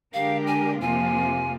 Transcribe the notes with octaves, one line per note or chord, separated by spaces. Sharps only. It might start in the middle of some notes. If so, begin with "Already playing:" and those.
D3 G#3 D4 G4 A#4 F5
G#5
F2 C3 F3 A#3 F4 G#5